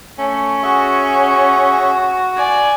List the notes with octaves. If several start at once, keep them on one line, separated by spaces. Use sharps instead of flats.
A3 C#4
F#4 G#4 E5 C#6
F#4
D5 G#5